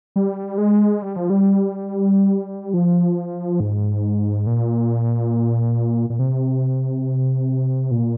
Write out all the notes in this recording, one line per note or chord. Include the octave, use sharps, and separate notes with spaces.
G3
G#3
G3
F3
G3
F3
G#2
A#2
A#2
C3
A#2